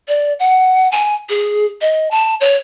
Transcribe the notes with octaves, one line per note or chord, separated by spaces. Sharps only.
D5
F#5
G#5
G#4
D#5
A5
C#5